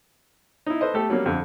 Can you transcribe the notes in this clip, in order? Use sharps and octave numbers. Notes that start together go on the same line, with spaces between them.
D#4 E4
A4 B4 C5 D#5
A3 G4 A4
F#3 G3 A#3 C#4
F2 D3